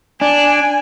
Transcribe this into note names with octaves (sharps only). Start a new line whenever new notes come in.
D4 G#5